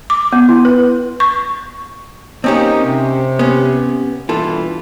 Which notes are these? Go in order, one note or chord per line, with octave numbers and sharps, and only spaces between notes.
D6
B3
E4
B4
C#6
A#3 C4 C#4 D#4 G4
C3
B3 C#4
G2 B2 E3 F4 A4